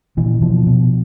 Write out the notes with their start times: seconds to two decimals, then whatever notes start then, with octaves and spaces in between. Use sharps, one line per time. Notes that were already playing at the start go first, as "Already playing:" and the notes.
0.17 A#2 E3
0.42 B2 F3
0.67 B2